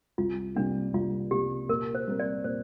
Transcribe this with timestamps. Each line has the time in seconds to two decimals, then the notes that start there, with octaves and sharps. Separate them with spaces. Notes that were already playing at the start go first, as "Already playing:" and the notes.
0.18 C2 F4
0.55 C3 G3 A#3 D4
0.94 C2 F4
1.31 C3 G3 A#3 G4
1.69 A#2 A#4
1.95 C5
2.07 G3 C4 A#4
2.19 D5
2.44 A#2 C5